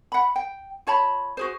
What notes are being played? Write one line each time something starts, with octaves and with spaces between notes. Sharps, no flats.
F#5 B5
G5
F4 C#5 A5 B5
F#4 G#4 C5